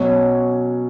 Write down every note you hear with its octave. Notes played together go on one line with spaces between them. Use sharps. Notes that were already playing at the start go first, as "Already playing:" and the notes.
Already playing: B2 F#3 C#4